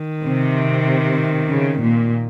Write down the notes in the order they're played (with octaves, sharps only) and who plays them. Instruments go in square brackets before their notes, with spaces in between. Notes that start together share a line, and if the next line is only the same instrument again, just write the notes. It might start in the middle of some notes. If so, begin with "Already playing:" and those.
Already playing: [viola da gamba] D#3
[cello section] C3
C#3
A#2